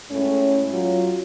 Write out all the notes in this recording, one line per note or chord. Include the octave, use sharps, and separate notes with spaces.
A2 G#3 C#4
F#3 F4